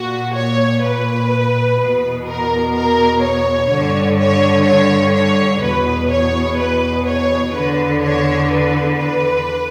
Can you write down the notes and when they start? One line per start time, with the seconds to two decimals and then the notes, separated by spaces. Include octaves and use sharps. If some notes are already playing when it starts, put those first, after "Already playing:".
Already playing: A#2 F#4
0.34 C#5
0.82 B4
1.79 E2 B2
2.26 A#4
2.74 A#4
3.22 C#5
3.70 G2 D3
4.18 C#5
4.66 C#5
5.14 C#5
5.61 E2 B2 B4
6.10 C#5
6.57 B4
7.06 C#5
7.53 E2 D3 B4
8.01 C#5
8.50 B4
8.97 B4